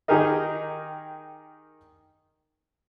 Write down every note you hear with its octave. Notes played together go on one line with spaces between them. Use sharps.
D#3 D#4 G4 G#4 A#4 D#5